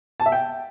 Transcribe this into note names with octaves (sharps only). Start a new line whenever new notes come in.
A5
E5
G5